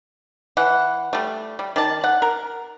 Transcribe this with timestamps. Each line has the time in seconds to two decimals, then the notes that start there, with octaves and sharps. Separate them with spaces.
0.57 E3 F#5
1.13 G3 A3
1.59 G3
1.76 D#3 D5 A5
2.04 F#5
2.22 A#4